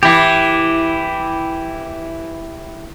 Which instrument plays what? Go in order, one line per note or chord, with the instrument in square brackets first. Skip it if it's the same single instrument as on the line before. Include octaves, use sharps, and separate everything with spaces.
[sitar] E3 [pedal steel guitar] E4 G4